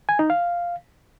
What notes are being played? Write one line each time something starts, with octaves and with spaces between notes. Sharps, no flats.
G#5
D#4
F5